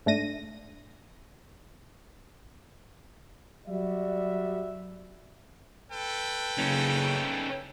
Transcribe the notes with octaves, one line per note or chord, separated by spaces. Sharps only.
G#2 A3 D4 A#6 D#7
F#3 G3 F#4 D5 E5
A4 B4 G5
F#1 C#3 C#4 D#4